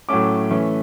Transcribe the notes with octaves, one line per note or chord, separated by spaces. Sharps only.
A2 F#3 A3 C#4 D6
E3 A3 C#4